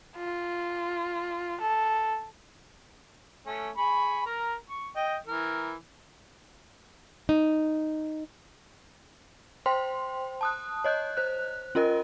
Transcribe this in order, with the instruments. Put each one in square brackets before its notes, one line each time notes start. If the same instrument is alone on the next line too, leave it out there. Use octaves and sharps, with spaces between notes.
[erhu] F4
A4
[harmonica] A3 C#4
G#4 B5 C#6
A#4 A#5
C#6
D#5 G5
E3 A#4
[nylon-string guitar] D#4
[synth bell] C5 G5 C6
A5 D#6 F#6
C#5 D#5 F#6 G6
C5 F#6
C#4 F4 A#4 D#5